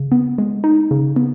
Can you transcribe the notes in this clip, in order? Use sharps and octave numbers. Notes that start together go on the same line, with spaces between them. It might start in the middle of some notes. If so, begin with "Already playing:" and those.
Already playing: C#3
B3
G#3
D#4
C#3
B3